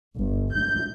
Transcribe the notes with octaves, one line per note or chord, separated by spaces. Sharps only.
G1
G6